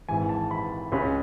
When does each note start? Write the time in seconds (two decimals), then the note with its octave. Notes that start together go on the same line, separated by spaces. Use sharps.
0.09 G#1 G#2 E3 G#5
0.29 A5
0.51 B5
0.92 C#2 C#3 G#3 C#4 B5